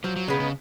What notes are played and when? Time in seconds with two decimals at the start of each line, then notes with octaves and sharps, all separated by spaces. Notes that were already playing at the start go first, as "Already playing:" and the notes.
0.04 F3 F#3
0.16 F#3
0.28 C#3 G#3 B3 D#4
0.40 C#3